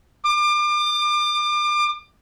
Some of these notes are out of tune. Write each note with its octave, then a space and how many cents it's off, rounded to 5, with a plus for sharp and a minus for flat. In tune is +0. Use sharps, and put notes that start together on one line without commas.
D6 +35